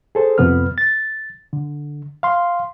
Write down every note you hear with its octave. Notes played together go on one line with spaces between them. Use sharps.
G#4 A4 C5
F2 C3 B3 B4 F6
A6
D3
F5 C6